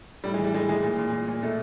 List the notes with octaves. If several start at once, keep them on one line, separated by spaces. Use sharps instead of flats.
A2 G3
G#3
E3
G3
A2 G#3
E3 G#3
A#2
A#2
A#2
A#2
B2 A3